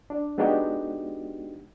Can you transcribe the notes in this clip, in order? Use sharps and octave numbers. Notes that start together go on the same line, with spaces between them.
D4
G#3 B3 D4 D#4 F#4 G4